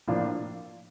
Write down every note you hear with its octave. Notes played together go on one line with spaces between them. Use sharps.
A2 F3 A#3 D4 F4